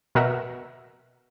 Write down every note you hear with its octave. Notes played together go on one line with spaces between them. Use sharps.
B2 A#4 E5 F#5